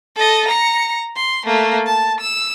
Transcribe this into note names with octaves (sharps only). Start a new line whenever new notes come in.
A4 D#5
A#5 C#7
C6
A3 A#3
A5
E6